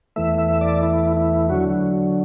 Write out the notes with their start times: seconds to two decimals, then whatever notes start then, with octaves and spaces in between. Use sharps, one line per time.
0.16 E2 E3 A3 E5
0.38 E5
0.61 D5
0.83 E4
1.17 E4
1.50 D3 F#3 F#4